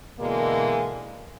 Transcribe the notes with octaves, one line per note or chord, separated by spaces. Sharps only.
B2 D3 E3 G#3 A#3